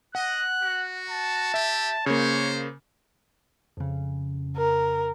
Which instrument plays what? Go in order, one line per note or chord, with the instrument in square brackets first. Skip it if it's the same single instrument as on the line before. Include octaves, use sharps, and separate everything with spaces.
[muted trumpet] D#5 [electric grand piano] F#5 [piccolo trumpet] F#6
[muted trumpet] F#4
[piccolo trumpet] A5
[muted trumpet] G4 [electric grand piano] E5
[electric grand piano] C#3 A#3 [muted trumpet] C5 [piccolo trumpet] C#5
[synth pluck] F2 C#3
[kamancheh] A#4